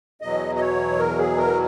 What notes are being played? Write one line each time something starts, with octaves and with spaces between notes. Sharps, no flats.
E2 B2 F#3 D#5
D#5
C#5
A#4
G#4
A#4